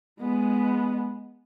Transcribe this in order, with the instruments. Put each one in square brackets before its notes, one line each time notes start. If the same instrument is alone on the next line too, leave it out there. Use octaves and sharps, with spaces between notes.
[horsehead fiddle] G#3 B3